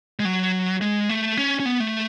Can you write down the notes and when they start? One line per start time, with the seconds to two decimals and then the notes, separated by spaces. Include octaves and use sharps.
0.19 G#3
0.25 F#3
0.81 G#3
1.09 A3
1.37 C#4
1.60 C#4
1.65 B3
1.80 A3